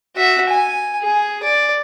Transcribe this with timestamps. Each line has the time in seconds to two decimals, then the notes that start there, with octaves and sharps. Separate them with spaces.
0.16 F#4 E5
0.49 G#5
1.02 G#4
1.43 D5